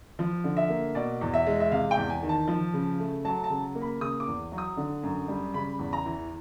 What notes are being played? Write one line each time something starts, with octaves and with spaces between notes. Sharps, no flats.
F3
D3
E5
A#3
B2 D5
E2
E5
G#3
E5
C3 F5
G5
E2
G#5
D#3
A5
F3
C#3
A3
F#3 A5
A5
C#3
A#3
B5
C#3 D#6
D6
E2
F#3
D#6
D3
F#2
G3
C#3 B5
E2
A#5
E3